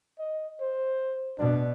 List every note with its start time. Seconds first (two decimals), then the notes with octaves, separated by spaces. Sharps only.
0.19 D#5
0.60 C5
1.39 B2 D4